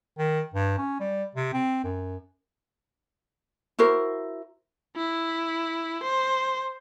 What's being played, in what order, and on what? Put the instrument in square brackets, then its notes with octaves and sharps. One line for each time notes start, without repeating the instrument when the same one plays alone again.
[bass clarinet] D#3
G2
C#4
G3
C3
C4
F#2
[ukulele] E4 F#4 A#4 C5
[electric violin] E4
C5